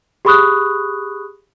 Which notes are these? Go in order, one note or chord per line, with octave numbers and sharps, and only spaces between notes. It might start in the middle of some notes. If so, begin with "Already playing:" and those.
G4 G#4 B5 C#6 D#6 F#6